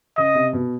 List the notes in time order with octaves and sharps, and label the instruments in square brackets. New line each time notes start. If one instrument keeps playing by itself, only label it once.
[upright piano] C#3 [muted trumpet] D#5
[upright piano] C3
B2